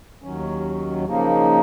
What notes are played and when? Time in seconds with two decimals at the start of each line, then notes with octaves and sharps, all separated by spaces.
0.22 D#2 D#3 F#3 C#4
1.04 C#3 F3 A#3 D#4